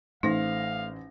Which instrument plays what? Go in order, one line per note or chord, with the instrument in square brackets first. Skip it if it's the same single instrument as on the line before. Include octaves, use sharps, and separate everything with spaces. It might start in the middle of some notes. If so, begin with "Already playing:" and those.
[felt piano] A1 C5 A#6 [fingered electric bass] A3 [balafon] D#4 [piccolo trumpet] F5